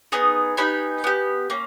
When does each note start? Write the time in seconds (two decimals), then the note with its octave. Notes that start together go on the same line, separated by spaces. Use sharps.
0.12 B3 D#4 G#4 D#6
0.57 B3 D#4 G4 G#5 B5
1.04 B3 G4
1.50 A#3 C#4